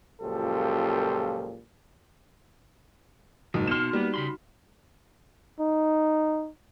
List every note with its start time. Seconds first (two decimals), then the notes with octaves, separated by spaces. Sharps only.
0.22 C#2 F#2 A#2 F3 G4 A4
3.54 F#1 G#2 D#4 F#4
3.67 B2 C6 F6 E7
3.93 G3 A#3 B3
4.14 C#3 B5 C6
5.60 D#4